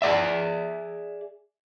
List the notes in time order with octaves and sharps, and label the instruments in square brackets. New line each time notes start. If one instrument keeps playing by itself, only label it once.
[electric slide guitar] G#4 C5 D5 E5